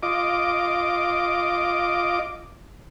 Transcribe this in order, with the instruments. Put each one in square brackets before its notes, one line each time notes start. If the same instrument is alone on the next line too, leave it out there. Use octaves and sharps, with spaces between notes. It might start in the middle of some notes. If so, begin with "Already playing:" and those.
[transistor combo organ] F4 D#5 D6